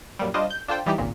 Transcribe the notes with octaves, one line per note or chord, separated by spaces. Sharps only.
F#2 A#2 G3
G3 D4 F4 C5 D#5
G6
D4 F4 A4 C5 G5
E3 G3 D#4 E4 G4
G#1 C#2 A#2